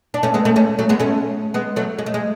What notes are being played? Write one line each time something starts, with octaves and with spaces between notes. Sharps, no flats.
D4
A3 C#4
G#3 B3
A3 C#4
A3 C#4
F#3 A3
G#3 B3
A3 C#4
G#3 B3
F#3 A3
G#3
A3
G#3